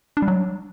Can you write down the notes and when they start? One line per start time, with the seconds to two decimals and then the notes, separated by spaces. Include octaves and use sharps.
0.17 D4
0.22 G3
0.28 F#3